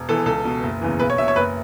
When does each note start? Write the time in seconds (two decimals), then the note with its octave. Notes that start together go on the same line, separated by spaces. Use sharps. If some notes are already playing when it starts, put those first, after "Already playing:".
Already playing: E1
0.09 E2 E3 A4
0.26 C#2 A4
0.45 B2
0.63 F#1
0.81 E2 C#3 E3
1.00 B1 B4
1.10 C#5
1.18 B2 E5
1.28 C#5
1.36 F#1 B4